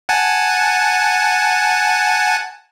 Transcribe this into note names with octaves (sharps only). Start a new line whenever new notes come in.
F#5 G#5 A5